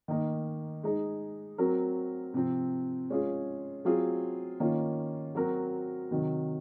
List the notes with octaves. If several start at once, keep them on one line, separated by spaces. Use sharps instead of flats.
D#3 A#3 D#4
G#3 D#4 G#4
F#3 C4 F#4 A#4
C3 F3 C4
G#3 C#4 F4 G#4
F#3 C4 F4 G#4
D#3 A#3 C#4 F4
F#3 C4 F#4 A#4
C3 D#3 F#3